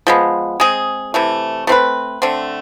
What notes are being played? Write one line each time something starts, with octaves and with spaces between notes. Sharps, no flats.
F3 G#3 B3
G#3 C4 G#4
C3 E3 A3
A3 C4 E4 B4
D3 A3 C4